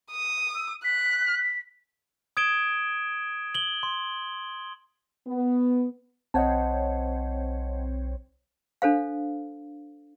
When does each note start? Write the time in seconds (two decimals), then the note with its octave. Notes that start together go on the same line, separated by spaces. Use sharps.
0.11 D#6
0.54 E6
0.84 F#6 B6
2.37 D#6 G#6 D7 E7 G7
3.55 F#7 G7
3.83 C6
5.27 B3
6.34 B1 C4 C5 C#5 D#5 F#5 A5
8.82 D4 A4 C5 F5